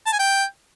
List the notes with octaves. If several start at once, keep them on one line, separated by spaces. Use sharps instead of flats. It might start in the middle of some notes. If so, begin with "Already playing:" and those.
A5
G#5
G5